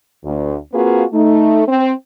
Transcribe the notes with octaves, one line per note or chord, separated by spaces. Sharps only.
D2
A#3 C4 F4 F#4 G#4 B4
A3 D#4
C4 C5